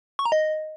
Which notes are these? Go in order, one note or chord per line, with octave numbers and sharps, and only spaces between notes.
C#6
A#5
D#5